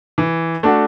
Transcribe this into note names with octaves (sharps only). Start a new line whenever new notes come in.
E3
A3 D4 F#4